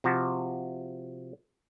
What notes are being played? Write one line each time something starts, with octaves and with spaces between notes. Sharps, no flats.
C3 F3 F#4 A5